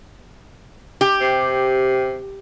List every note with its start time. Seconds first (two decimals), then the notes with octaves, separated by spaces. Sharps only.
1.01 G4
1.21 C3